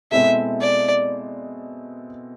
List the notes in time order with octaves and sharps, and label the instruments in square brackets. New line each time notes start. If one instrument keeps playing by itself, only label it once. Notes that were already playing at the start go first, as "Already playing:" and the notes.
[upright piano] B2 G#3 C4 E4 A4 [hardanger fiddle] E5
[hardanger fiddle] D5